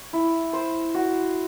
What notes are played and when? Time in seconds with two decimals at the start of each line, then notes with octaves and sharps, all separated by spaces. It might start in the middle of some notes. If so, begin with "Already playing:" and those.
Already playing: C#5
0.13 E4
0.53 C5
0.94 F#4